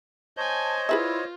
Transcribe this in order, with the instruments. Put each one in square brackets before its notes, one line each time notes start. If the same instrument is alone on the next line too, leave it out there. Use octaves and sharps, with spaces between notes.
[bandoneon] C5 C#5 D#5 [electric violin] G#5 G6 [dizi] A5
[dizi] E4 [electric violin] F4 [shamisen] G#4 B4 E5